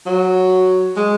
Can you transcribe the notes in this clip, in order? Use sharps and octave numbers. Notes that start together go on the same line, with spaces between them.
F#3
G#3